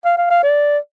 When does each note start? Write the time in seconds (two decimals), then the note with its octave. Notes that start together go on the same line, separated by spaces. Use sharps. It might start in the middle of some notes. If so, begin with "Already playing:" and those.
0.05 F5
0.18 F5
0.30 F5
0.43 D5